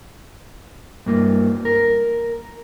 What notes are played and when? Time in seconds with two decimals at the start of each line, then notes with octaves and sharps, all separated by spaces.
1.06 G2 A#3
1.65 A#4